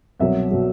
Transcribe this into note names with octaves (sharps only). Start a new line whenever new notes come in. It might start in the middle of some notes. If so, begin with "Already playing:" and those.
C2 B2 F#3 E5
B2 F#3